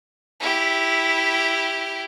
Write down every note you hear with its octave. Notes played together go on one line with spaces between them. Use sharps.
E4 G4